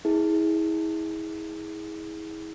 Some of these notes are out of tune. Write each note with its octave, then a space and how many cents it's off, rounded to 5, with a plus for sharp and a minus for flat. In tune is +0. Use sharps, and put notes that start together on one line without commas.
E4 -35 G#4 +0